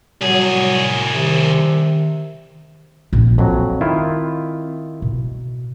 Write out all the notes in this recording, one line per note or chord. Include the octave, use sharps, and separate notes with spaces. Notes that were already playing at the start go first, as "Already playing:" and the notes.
C2 F#3 G3 G#4
C3 D#3
A#1 F2
F2 F#3 C4
D#3 E4 F4
B2